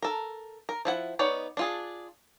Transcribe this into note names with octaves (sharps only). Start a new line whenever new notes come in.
A4 A#4
A#4
F3 E4 F#5
B3 D#4 C#5 D5
D4 F4 G#4